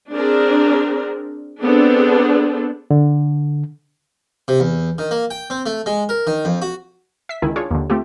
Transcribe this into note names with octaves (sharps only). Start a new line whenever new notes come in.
C4 D4 G#4 A#4
B3 C4 D4 G#4 A4
D3
C3
E2
D#3
A#3
G5
C4
A3
G#3
A#4
D#3
F2
F#4
E5 B6
C#2 D#3 E4 G#5
D4 F4 G#4 C#5
D#2 D3
A3 C4 F4 G4